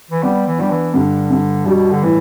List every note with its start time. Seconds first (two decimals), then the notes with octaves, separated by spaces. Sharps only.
0.11 E3
0.23 G3 B3
0.46 E3
0.58 G3 D4
0.70 E3
0.94 G2 D3
1.30 G2
1.65 B2 G3
1.91 D3
2.02 A2 E3